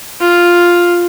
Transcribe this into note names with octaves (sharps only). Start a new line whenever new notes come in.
F4